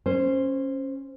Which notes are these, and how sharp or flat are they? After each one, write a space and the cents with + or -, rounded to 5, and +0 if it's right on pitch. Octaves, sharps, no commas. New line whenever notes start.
C#4 -15 C5 +0